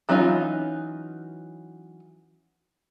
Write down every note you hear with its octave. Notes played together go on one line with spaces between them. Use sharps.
E3 F#3 C#4 D#4 F4